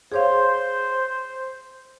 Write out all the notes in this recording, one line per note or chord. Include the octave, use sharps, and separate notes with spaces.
G#4 C5 C#5 F5